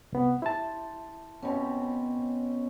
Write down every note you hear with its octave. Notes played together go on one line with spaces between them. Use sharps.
C2 B3
E4 C5 A5
B2 C4 C#4